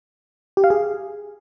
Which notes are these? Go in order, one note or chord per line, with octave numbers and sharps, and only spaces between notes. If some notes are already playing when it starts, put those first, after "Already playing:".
G4
F5
G#4